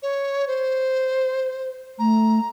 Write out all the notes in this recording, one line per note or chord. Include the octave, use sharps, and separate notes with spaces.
C#5
C5
A3 A#5